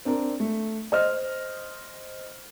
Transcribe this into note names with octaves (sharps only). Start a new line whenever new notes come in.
C4 D4 A#4
A3
C5 D#5 F6